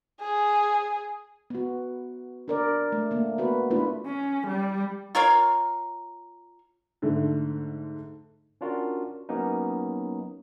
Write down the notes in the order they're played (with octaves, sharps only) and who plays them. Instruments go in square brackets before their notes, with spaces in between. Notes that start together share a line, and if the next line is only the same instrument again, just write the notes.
[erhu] G#4
[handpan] B3 F#4
D4 A#4 D5
A3
A3 A#3
B3 F#4 B4
A3 B3 D4 E4 F4 B4
[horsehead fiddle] C#4
G3
[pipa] F4 A#4 C#5 F5
[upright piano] G#2 D3 A3
[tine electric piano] C#4 D4 F4 F#4 A#4
F#3 A#3 B3 C#4 D#4